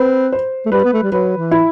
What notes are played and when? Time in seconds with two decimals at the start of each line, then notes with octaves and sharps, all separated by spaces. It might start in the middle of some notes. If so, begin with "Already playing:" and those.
Already playing: C4 B4
0.32 C5
0.66 A3
0.72 G3 B4
0.84 B3
0.93 A3
1.03 G3
1.12 F#3 B4
1.38 E3
1.51 E4